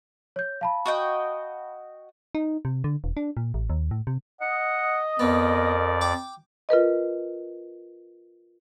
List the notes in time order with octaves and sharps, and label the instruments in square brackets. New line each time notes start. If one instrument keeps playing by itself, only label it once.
[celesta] C#5 G6
F5 A5 B5
[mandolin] F#4 D#5 G5
[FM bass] D#4
C3
D3
E1
D4
A#2
A1
D#2
A2
C3
[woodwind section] D#5 [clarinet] F#5
[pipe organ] F2 D5 [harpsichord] B3 [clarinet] A#4
[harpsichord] G5 D6
[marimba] F4 A#4 B4 D#5